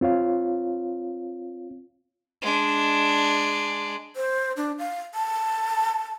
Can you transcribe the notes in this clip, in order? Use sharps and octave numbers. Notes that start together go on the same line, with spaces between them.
C4 F4 C#5 F5
G#3 D4
C5
D4
F5
A5